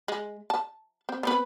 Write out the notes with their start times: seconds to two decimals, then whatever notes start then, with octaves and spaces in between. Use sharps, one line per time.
0.08 G#3
0.50 A5
1.09 C4
1.23 B3 C4 B4